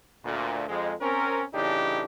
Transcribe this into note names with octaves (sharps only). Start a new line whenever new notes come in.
D2 A#2
F2 G#3
C4 C#4 A#4
A2 C#3 E3 D4 D#4 G4